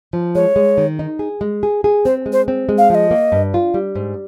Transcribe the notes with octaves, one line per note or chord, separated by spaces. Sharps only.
F3
G#3 C#5
G#3
D#3
D#4
G#4
G#3
G#4
G#4
C4 C5
G#3
C5
C4
G#3
F5
F3 D#5 F5
A#3
G2
F4
G3
G#2